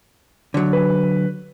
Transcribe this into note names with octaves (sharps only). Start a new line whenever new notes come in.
D3 F#3
B4